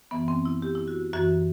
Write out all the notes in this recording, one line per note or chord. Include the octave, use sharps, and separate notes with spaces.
F#2 E3 B3
C4
E4
G4
E4
F#4
F#2 E3 F#4